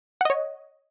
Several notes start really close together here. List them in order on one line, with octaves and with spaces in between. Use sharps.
F#5 D#5 C#5